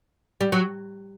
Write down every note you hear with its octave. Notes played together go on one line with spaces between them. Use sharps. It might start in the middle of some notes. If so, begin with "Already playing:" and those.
G3
F#3